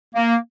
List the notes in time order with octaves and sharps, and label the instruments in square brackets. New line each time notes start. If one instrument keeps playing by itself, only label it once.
[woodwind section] A#3